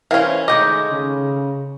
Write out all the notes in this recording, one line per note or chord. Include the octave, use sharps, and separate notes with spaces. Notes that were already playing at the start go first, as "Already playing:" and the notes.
E3 C#4 A#4 C5 F5
D#3 G#3 A3 D#5 D6 G6
C#3